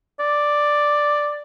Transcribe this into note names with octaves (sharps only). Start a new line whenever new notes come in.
D5